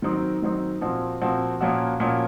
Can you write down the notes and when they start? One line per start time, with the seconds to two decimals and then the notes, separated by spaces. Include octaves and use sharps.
0.02 D#3 F#3 C4 D#4
0.42 D#3 F#3 C4 D#4
0.81 A#2 F3 C4 F#4
1.22 A#2 F3 C4 F#4
1.61 A#2 F3 A#3 C#4 F#4
2.00 A#2 F3 A#3 C#4 F#4